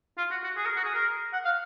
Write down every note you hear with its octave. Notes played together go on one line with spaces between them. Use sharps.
F4
F#4
F#4
G#4
A#4
F#4
G#4
A#4
F#5
F5